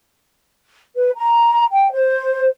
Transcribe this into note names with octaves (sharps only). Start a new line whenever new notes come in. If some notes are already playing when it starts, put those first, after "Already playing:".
B4
A#5
G5
C5